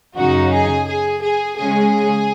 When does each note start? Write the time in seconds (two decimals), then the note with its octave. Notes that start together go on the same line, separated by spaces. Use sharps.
0.17 F#2 C#3 F#3 D#4 F#4
0.52 G#4
0.88 G#4
1.23 G#4
1.58 C#3 G#3 C#4 G#4